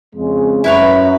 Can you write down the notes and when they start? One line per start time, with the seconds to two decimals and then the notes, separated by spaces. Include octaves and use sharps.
0.15 F2 C#3 G#3
0.64 F#2 E4 B4 C#5